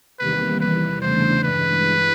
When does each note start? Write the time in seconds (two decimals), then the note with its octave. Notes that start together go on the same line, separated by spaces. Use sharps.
0.19 E2 C3 D#3 G3 A#3 B4
0.60 E2 C3 E3 G3 B4
1.02 E2 C#3 E3 A3 D4 C5
1.44 G2 E3 G#3 B4